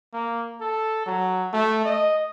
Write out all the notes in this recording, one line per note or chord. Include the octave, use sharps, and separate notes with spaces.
A#3
A4
F#3
A3
D#5